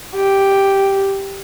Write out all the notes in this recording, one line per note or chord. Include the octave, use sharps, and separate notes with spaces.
G4